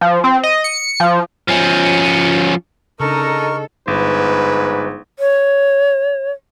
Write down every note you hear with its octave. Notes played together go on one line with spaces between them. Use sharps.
F3
C4
D#5
C#7
F3
F3 C#4
C#3 D4 D#4 A4 A#4 D#5 C#6
G1 G#2 B4
C#5